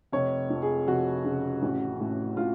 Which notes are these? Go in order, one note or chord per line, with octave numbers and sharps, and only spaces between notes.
F1 C#5
F2
G#4
F1 F#4
C#3
A1
A2
A2 F4